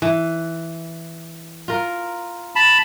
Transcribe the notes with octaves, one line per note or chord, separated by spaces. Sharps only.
E3
F4 A#4
A5 B5